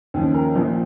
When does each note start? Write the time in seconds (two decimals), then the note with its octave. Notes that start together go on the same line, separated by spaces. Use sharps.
0.14 D#2 C#3 F3 C#4
0.34 A#4
0.55 A#1 A#2 F3